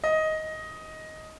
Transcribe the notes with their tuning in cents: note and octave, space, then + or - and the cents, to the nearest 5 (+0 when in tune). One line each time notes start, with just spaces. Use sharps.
D#5 +10